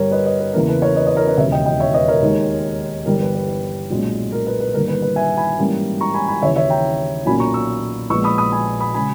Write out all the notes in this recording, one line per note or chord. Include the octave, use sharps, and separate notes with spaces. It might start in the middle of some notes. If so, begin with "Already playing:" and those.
Already playing: G1 G2 G3 A#4 C#5
B4 D#5
B4 D#5
B4
E2 C#3 E3 A#3 A#4
B4
A#4 C#5
B4 D#5
B4 D#5
A#4 C#5
B4 D#5
E1 D#2 C#3 C#5 E5
D#5 G5
D#5 G5
C#5 E5
B4 D#5
A#4 C#5
D#2 D#3 G#3 D#4
G1 G2 E3 G3 A#4
B4
B4
B4
B1 A#2 G#3 C#4
A#4
B4
B4
G1 G2 D#3 A#3 A#4
B4
B4
E5 G#5
G#5 B5
G#2 E3 G3 A#3 C#4
A#5 C#6
G#5 B5
G#5 B5
D#2 C#3 E3 C#5 E5
C#5 E5
G5 A#5
B1 A#2 A#3 C#4 G#5 B5
A#5 C#6
C#6 E6
A#1 A#2 G#3 B3 C#6 E6
B5 D#6
B5 D#6
G#5 B5
B5 D#6
C#3 G#3 G#5 B5